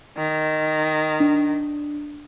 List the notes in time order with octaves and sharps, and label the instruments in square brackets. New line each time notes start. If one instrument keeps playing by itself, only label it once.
[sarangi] D#3
[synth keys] D4